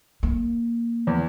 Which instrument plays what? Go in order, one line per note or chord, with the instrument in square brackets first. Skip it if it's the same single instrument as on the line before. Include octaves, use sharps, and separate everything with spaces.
[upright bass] A#3
[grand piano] E2